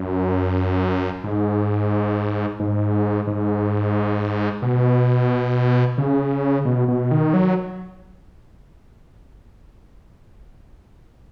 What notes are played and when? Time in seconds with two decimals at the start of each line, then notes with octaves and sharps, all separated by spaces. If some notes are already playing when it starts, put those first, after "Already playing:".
Already playing: F#2
1.24 G#2
2.60 G#2
3.27 G#2
4.62 B2
5.98 C#3
6.65 B2
6.88 B2
7.11 D#3
7.34 F#3